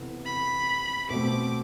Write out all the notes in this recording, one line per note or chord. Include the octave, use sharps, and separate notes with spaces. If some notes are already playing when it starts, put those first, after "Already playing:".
Already playing: C3 E3 B3 A4
B5
B2 A3 C4 D6